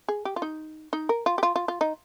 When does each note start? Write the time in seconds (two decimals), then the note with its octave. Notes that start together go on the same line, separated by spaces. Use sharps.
0.08 G#4
0.25 G4
0.36 F4
0.42 D#4
0.93 D#4
1.09 A#4
1.26 F4
1.38 G4
1.43 F4
1.56 F4
1.68 F4
1.81 D#4